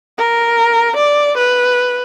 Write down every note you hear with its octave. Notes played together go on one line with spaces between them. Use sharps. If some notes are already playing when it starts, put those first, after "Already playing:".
A#4
D5
B4